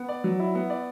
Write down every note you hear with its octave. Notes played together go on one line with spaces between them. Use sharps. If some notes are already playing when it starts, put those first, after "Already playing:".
Already playing: B3
D5
F#3
E4
B3
D5